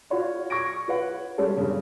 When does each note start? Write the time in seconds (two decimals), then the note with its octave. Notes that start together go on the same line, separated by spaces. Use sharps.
0.10 F4 F#4 C#5 D5
0.50 C#6 G#6 A#6 D7
0.88 F4 B4 C#5 F#5
1.38 G3 G#3 C#4 G#4 A4
1.56 G2 C#3 G4